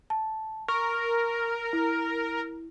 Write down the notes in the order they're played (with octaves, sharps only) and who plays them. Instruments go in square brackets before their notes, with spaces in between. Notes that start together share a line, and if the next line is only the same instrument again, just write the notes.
[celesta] A5
[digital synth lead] A#4 [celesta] C#6
[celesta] E4